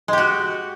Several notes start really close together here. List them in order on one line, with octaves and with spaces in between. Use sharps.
G#3 G4 F#4